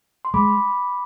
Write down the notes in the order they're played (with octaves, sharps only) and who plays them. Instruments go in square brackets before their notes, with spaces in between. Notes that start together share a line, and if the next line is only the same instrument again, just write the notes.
[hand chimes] C6
[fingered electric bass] G#3 [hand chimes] B5 D6